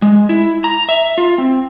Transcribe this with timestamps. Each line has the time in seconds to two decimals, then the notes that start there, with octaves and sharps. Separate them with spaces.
0.02 G#3
0.29 E4
0.64 A#5
0.89 E5
1.18 F4
1.38 C4